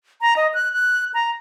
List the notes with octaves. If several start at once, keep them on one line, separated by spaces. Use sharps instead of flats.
A#5
D#5
F#6
F#6
A#5